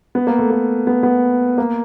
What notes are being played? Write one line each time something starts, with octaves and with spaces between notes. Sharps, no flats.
B3
A#3
A3
A#3
B3
B3
A#3